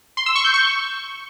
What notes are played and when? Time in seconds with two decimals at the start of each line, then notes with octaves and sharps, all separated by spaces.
0.17 C6
0.26 E6
0.35 C#6
0.45 G6
0.54 C#6